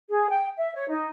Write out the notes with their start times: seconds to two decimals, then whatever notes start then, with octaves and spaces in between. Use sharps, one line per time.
0.10 G#4
0.30 G5
0.57 E5
0.75 C#5
0.89 D#4